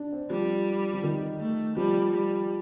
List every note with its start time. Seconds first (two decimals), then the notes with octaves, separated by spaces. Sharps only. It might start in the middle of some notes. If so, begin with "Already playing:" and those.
Already playing: D4
0.12 C4
0.30 F3 G3
0.94 F3
1.04 D#3
1.40 A3
1.76 F3 G3
2.13 G3